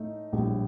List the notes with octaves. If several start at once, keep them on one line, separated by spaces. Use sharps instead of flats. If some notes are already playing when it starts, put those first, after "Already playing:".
Already playing: A2 A3 D#4
A#1 A2 G3